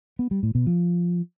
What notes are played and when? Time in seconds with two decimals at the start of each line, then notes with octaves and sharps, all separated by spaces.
0.19 B3
0.31 G3
0.43 A2
0.55 B2
0.67 F3